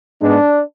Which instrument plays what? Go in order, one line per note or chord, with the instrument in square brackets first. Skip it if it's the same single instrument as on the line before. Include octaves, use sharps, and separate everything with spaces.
[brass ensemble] G#2 G#3 B3 D4